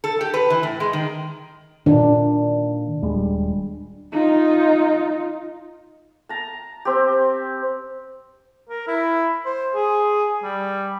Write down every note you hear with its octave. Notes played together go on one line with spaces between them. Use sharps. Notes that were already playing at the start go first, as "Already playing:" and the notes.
A4
G4
B4
E3
A2
G#3
D#3
A#2 D#3 D4
D#1 G3 G#3
D#4 F4
A5 A#5
C4 G4
A#4
E4
C5
G#4
G3